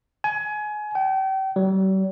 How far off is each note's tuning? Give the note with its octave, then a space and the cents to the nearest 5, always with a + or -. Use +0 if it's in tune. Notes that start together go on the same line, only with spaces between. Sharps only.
G#5 +25
G5 -35
G3 -45